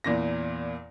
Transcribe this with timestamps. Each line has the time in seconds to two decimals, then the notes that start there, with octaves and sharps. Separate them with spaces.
0.04 E2 A#2 A#6